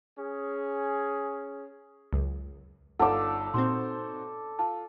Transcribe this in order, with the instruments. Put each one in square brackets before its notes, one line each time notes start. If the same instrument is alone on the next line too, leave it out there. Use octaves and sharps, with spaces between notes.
[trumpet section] C#4 G#4
[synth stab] C#2 F#2
[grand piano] G1 D#4 F4 [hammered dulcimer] A4 D5 [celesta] F#5
[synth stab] A#2 C4 [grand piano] D#4 F#4 C5 [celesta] C6
[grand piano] F4 [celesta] A5